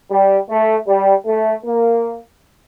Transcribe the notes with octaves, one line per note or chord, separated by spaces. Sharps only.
G3
A3
G3
A3
A#3